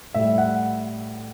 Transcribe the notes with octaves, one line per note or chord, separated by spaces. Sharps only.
A2 G3 E5
F#5